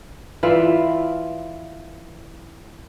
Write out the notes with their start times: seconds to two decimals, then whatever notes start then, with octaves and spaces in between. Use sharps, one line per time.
0.43 E3 F4 D5 E5